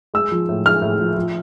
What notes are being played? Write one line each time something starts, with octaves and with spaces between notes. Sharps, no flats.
G#3 E6
F3
A2
G#3 F6
A2
F3
F3